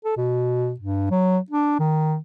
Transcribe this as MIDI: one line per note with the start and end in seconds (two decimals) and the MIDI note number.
0.05 0.16 69
0.17 0.73 47
0.80 1.10 43
1.10 1.38 54
1.51 1.79 62
1.79 2.16 51